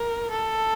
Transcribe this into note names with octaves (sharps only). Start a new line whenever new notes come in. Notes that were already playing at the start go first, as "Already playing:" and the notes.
Already playing: A#4
A4